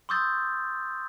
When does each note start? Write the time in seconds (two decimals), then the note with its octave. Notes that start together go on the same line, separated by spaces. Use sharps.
0.09 C6 C#6 D#6 E6 G6 A6